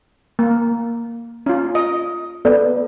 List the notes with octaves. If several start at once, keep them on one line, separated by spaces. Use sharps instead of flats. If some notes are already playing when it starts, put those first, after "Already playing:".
A#3
C#4 F4
D#5
B3 A4 D5